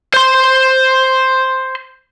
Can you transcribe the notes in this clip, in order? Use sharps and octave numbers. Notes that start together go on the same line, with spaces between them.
C5 C6